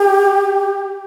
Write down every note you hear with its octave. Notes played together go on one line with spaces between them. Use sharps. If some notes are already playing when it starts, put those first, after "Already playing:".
Already playing: G4